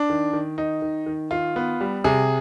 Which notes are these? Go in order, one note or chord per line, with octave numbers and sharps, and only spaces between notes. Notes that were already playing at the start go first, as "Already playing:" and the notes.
Already playing: D4
D#3
D#3
D#3 D#4
D#3
D#3
D#3 F4
B3
G3
C3 G#4